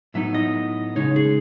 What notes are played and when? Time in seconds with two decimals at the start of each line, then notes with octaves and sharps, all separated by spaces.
0.14 A2 F#3 B3 D#4 E5
0.34 D#5
0.96 C#3 G#3 D#4 C#5
1.16 G#4